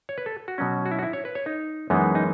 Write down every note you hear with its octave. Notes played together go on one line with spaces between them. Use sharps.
C#5
B4
A4
F#4
B2 F#3 C#4
F#4
E4
F#4
E4
C#5
B4
C#5
D#4
F#2 E3 G#3 B3 D#4
D#4